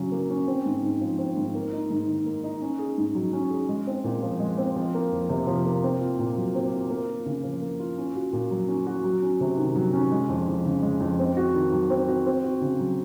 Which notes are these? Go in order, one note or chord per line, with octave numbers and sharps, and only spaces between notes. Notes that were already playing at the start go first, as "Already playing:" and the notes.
Already playing: C#3 F#3 C#4
A#3
C#4
C4
G#2
G#2
F3
C4
G#2
A#3
D#4
G#2
D#3
A#3
D#4
C#4
G#4
G#2
F#3
C#4
G#4
G#3
C4
A#2
F3
G#3
C4
F3
A#3
F2
C3
F3
A#3
C4
F4
A#2
F#3
C4
F4
A#3
F4
C#3
F3
A#3
F4
C#4
F#4
A#2
F#3
C#4
F#4
F#3
C#4
C3
D#3
F#3
C#4
G#3
F2
F2
C#3
G#3
F2
C4
F#4
D#3
F#3
C4
F#4
C4
F#4
C#3
F#3